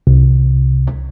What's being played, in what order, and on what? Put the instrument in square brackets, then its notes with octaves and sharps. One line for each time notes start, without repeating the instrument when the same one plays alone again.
[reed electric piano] C2